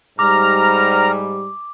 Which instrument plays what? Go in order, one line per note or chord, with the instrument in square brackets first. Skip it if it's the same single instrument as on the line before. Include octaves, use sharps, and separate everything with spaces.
[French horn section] G#2 G3 [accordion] A#5 F6 [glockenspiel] D6